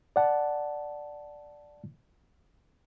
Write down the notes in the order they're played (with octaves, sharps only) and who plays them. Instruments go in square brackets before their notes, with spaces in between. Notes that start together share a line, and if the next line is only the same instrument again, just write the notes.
[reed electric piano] D5 F#5 A5